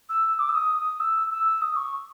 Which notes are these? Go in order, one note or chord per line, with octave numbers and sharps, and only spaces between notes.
E6
D6
E6
D#6
E6
E6
D#6
C#6